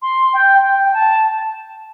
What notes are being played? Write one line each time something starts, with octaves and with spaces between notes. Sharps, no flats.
C6
G5
G5
G5
A5